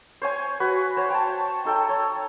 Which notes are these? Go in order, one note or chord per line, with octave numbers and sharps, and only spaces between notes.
C5 C#5 G#5
F#4 B4
C5 C#5
G5 A5
D#4 A4 G5
C#5